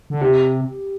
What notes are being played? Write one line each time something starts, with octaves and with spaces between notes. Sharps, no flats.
D3
C3 G4